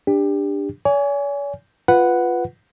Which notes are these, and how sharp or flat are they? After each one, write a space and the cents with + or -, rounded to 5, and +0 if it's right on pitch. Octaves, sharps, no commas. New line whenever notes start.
D4 +0 G4 +25
C#5 +45 G#5 +0
F4 +0 B4 +0 F#5 +0